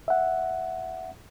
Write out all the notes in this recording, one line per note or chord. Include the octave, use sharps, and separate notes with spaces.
E5 F#5